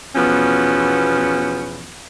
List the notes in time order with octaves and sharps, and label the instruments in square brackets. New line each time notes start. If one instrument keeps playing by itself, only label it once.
[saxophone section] E2 B2 F3 B3 C#4